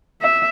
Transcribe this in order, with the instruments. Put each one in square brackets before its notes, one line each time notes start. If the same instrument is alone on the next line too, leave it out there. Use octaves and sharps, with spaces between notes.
[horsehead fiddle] E5